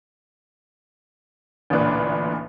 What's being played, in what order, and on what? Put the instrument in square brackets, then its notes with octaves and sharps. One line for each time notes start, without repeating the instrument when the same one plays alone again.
[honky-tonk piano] A1 D2 A#2 D4 B4